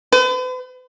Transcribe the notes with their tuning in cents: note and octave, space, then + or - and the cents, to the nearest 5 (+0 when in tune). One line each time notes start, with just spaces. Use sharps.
B4 +45